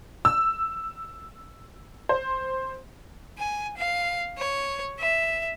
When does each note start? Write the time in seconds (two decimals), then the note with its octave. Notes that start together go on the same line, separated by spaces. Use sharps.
0.25 E6
2.09 C5
3.38 G#5
3.78 F5
4.39 C#5
5.00 E5